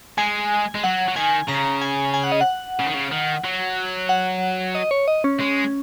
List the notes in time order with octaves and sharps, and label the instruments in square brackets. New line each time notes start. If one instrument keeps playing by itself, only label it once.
[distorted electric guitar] G#3 [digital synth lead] G#5
[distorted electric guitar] G#3
[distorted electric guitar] F#3 [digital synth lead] F#5
[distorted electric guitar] F#3
[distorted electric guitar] D#3 [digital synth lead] G#5
[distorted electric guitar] C#3 [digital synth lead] A#5
[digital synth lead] G#5
G#5
F#5
D#5
F#5
[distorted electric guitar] C#3
D#3
C#3
D#3
F#3
[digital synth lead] F#5
D#5
C#5
D#5
C#4
[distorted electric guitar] G#3